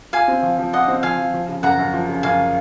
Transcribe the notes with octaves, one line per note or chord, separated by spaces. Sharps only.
F4 F5 G#5
C4
F3
F3
F4 D#5 F#5
C4
F3 F5 G#5
F3
F3
C#3
F#2 F#5 A#5
F#2
F3
C#3
F#2 F5 G#5